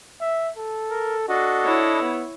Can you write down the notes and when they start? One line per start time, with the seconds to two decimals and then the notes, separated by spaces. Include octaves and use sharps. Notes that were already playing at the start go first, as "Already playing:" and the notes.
0.21 E5
0.57 A4
0.90 A#4
1.29 D4 F#4 A4 D#5
1.63 E4 C#5
2.01 B3